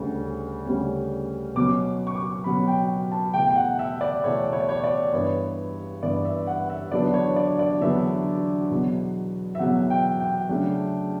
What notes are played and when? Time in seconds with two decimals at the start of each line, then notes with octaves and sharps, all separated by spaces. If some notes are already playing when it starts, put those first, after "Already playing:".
Already playing: D2 C#3 G3 C#4
0.66 D2 C#3 G3 C#4
1.55 B2 F#3 C#4 D6
2.07 C#6
2.15 D6
2.44 B2 F#3 C#4 B5
2.68 G5
3.12 A5
3.34 E2 B2 A3 G5
3.46 G5
3.56 F#5
3.79 E5
4.01 D5
4.23 E2 B2 A3 C#5
4.53 C#5
4.60 D5
4.69 C#5
4.84 D5
5.13 G2 E3 B3 C#5
6.03 G2 E3 B3 D5
6.25 E5
6.47 F#5
6.70 E5
6.92 E2 D3 F#3 B3 D4 D5
7.14 C#5
7.36 D5
7.59 D5
7.81 E2 D3 F#3 B3 D4 E5
8.71 E2 B2 F#3
9.55 E5
9.59 E2 B2 F#3 F#5
9.90 G5
10.20 G5
10.49 C#3 F#3 A3 D4